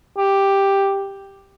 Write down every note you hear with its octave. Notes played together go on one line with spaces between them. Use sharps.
G4